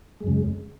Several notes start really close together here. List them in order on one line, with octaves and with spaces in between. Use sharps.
G#3 F#2 C#3